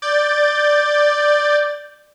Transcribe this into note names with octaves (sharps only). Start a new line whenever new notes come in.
D5 G6 A6